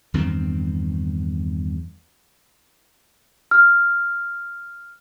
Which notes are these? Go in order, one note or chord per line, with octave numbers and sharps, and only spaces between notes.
E2 G2 D#3 C4
F6